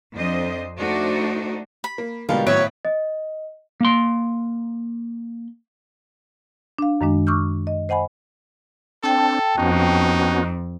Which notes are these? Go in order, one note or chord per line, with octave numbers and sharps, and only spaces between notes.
F2 D4 C5 D#5
A3 D4 D#4 F#4 C5 D5
B5
A#3
B2 D3 F3 G3 G#3 A#4 F5
G#1 A2 F#3 B4 C#5 E5 D7
D#5
A#3 C6
D4 F5
F#2 D#3 G#3 D4
C#6 D6 E6 F6 G6
D#5
C5 D#5 F#5 G#5 B5
C4 D4 A4 G5 A5
F2 B3 C#4 D#4 F#4